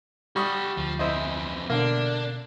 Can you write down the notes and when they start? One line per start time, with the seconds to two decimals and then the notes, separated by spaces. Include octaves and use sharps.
0.36 G3 G4 F#5 C#6 D#6
0.77 D2 F3
0.99 F2 E3 E4 C5 D#5
1.70 B2 D3 A#3 D4